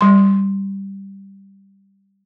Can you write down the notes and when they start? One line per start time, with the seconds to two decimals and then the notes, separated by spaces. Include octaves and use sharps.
0.01 G3 C6